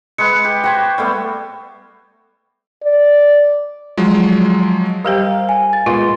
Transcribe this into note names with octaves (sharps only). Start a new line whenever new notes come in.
G#3 B4 F#5 C#7
G4
F#4 C5 G5 C#6 G#6
G3 A3 B3
D5
F3 F#3 G#3
G3 G4 A#4 C5 F5 G5
G#5
A6
A#2 G#3 B3 F4 C6